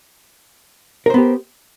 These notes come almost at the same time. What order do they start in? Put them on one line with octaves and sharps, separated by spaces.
A#4 C5 B3 G4